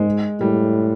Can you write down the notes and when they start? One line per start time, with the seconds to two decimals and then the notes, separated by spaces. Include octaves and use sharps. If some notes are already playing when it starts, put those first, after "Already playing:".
Already playing: G#2 G#3
0.40 A2 G3